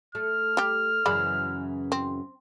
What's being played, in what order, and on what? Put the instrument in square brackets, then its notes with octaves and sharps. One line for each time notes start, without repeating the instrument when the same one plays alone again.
[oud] A3 [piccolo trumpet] F6
[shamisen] G3 G4
[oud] F#2 C#3 E3 [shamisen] G#3 D5 B5
[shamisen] C4